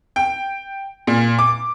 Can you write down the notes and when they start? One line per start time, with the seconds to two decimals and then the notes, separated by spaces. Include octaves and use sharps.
0.16 G5
1.07 A#2
1.39 D6